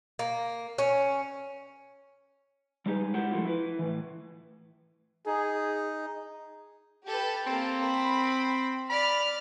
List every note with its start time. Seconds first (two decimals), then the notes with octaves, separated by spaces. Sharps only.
0.19 A#3
0.78 C#4
2.86 G3 G#3 D#4 G4 G#4 B4
3.14 E4 G4 A#4 C5 F#5
3.31 F3 G3 A3 E4 F4
3.45 E4 B4
3.79 A2 E3
5.26 D#4 G#4
7.06 G4 A4 B4
7.46 A#3 C4 A4
7.84 B5
8.89 D5 B5 F6